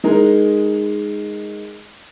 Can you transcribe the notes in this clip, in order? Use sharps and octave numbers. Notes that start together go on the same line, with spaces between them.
G#3 D#4 A#4